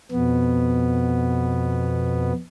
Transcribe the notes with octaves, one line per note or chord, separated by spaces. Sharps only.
F2 B2 B3